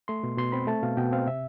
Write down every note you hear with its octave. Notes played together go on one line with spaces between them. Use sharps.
A3 C6
B2
B2 C6
C4 B5
A3 A5
B2 F5
B2 G5
C4 F5
C3 E5